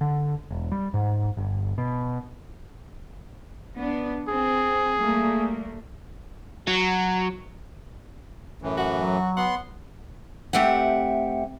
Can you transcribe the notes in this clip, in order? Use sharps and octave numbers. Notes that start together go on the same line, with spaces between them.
D3
E1
G3
G#2
G1
B2
B3 D4
C4 G#4
G3 A3 A#3
F#3
F#2 A2 E3
F#4
F#3
B3 F#5 C6
A3 C4 G4 E5 F#5